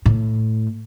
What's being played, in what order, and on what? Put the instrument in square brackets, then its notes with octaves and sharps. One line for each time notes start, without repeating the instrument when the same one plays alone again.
[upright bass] A2